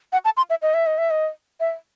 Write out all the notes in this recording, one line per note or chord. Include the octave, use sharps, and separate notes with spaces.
F#5
A5
C6
E5
D#5
E5
D#5
E5
D#5
E5